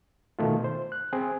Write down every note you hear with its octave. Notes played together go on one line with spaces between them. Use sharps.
B2 D#3 A3 F4
C5
F#6
C4 G#4